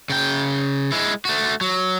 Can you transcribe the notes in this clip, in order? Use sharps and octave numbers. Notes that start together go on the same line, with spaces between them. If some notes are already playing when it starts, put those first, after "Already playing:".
C#3 G5
G#3 E4
A3 F#4
F#3